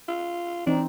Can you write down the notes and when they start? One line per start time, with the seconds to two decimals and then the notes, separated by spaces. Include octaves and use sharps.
0.08 F4
0.66 E3 C4 D4 D#4